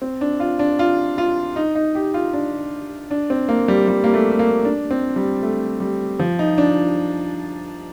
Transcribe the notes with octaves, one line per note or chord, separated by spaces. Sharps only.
C4
D4
F4
D4
F4
F4
D#4
D#4
G4
F4
D4
D4
C4
A#3
G3
G3
A#3
A3
A#3
D4
C4
G3
A3
G3
F3
D#4
D4